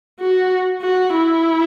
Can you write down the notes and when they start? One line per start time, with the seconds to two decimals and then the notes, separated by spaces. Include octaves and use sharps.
0.20 F#4
0.82 F#4
1.14 E4